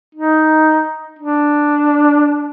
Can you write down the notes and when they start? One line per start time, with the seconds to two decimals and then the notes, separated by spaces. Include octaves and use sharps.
0.15 D#4
1.19 D4